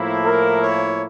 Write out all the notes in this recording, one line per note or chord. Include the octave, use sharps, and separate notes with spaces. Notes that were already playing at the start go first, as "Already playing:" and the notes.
Already playing: A2 F3 A#3 E4
A#4
C#5